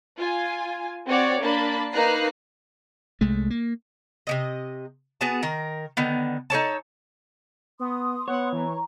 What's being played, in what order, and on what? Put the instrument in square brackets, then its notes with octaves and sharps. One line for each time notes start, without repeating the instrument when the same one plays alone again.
[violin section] F4 G#5
C4 F#4 C#5 D5
A#3 D4 A5 B5
A#3 D#4 B4 A#5 F#6 C7
[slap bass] C2 G#3 A3
A#3
[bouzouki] C3 D#3 D#5
B3 F#4 G#4 A5
D#3 A#4
D3 D#3 B3
D#4 A4 C#5 A5
[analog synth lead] B3 [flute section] C6 D#6
[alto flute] B3 [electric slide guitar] C#5 [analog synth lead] F#5
[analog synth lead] E3 [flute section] A#5